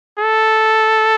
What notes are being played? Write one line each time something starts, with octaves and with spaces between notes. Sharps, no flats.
A4